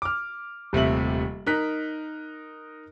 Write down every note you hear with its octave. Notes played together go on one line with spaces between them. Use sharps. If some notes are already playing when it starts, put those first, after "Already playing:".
D6 F6
D#1 C3 A3 E5 F#7
D#4 A#4 F#6 B6